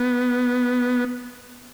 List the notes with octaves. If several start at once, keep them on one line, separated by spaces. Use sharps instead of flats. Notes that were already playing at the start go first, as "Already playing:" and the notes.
Already playing: B3